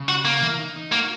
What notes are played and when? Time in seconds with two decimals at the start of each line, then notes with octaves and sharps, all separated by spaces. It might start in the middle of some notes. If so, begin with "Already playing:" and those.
Already playing: C#3
0.09 F#4
0.25 A#3
0.42 E3
0.59 D#4
0.76 D#4
0.92 A#3 F#4